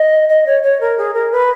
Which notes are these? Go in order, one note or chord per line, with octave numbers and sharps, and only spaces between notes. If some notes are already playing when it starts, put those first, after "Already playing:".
Already playing: D#5
D#5
C#5
C#5
A#4
G#4
A#4
B4